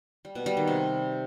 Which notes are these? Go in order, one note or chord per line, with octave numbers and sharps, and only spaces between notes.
G3
B2
G3
D#3
C3